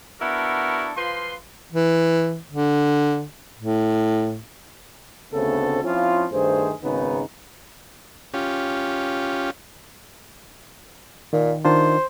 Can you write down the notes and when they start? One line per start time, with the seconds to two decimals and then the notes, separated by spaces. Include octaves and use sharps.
0.20 B3 D4 E4 F#4 A4 A#4
0.96 F3 F4 B4 C6
1.73 E3
2.52 D3
3.59 A2
5.34 D2 C#3 A3 B3 C4 A4
5.84 F3 C4 C#4 E4 F4
6.31 G2 D#3 A3 G#4 C5
6.82 G#1 C#3 B3 D#4
8.34 C#4 F4 G4
11.33 A#2 D#3
11.65 D#3 D4 F4 C5